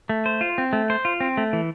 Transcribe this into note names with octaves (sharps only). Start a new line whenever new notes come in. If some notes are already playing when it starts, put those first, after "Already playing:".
A3
C5
F4
C4
A3
C5
F4
C4
A3
E3